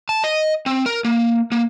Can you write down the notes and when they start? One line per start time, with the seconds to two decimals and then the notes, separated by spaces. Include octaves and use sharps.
0.09 A5
0.24 D#5
0.66 C4
0.86 A#4
1.04 A#3
1.52 A#3